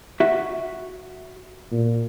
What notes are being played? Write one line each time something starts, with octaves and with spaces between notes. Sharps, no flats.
F#4 E5
A#2